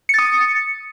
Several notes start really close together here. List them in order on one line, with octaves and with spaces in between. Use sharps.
C#7 A6 D#6